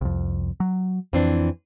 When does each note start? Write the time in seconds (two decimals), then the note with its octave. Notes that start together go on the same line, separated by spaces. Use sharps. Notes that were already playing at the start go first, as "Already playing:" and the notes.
0.01 C2 F2
0.60 F#3
1.13 F2 E3 C4 D4